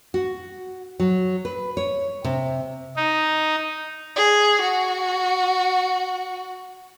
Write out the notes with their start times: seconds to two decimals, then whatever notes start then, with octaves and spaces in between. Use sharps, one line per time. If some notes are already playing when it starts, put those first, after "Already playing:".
0.14 F#4
1.00 F#3
1.45 B4
1.77 C#5
2.24 C3
2.96 D#4
4.16 G#4
4.61 F#4